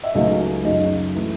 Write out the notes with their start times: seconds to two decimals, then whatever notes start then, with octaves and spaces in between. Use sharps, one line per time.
0.04 E5
0.15 C#2 C#3 F#3 A3 D#4 D#5
0.64 F#2 C#3 F#3 D#4 D#5
1.15 E3 A3